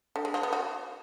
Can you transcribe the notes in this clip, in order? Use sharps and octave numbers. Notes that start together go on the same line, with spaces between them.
D3
G#3
F3
B3
F#4